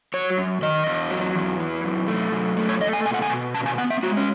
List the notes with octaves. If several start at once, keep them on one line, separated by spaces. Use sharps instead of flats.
F#3 C#5
F#2
D#3 D#5
E2
F#3
E2
E3
F#2
A3
F#2
A3
C#5
A3 D#5
G#5
B2 G#5
F#5
G#5
B2
C#3 A5
G#5
B3 F#5
E5
G#3 F#4
C#4